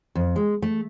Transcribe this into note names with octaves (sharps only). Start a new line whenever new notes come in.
F2
G#3
A3